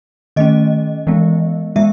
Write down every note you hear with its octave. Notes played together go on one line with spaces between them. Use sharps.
D#3 A3 C#4 D#5
E3 G#3 B3
E3 G#3 B3 E5